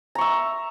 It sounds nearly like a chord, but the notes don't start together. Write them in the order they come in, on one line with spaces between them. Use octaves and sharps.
A#5 C#6 E5